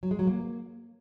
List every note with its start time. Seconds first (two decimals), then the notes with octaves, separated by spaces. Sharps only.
0.03 F#3
0.11 G#3
0.19 F#3
0.27 A#3